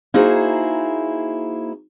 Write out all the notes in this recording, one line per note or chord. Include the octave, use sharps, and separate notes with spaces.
A#3 D#4 E4 F#4 G#4 C5